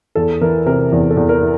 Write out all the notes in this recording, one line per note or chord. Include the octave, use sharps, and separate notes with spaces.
E2 A4
E3 A#4
C3 A#4
E2
A4
E2
A#4
E3